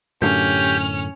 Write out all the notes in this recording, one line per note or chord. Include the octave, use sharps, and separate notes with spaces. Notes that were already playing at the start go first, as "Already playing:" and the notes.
F#2 A2 D3 C#4 G4 F6